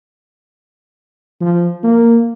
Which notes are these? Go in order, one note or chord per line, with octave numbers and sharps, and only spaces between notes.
F3
A#3